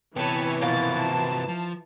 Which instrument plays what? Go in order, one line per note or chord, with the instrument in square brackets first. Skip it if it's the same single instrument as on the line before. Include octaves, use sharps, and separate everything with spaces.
[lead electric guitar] C3 B3 [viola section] E3 [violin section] B4 C#5 A5 [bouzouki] G5
[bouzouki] B2 F3 A#3 [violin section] A6
[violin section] A5
[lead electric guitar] F3